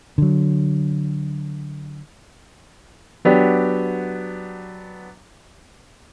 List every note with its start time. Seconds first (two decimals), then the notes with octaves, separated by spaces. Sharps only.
0.18 D3 F#3
3.25 F#3 B3 D4 G4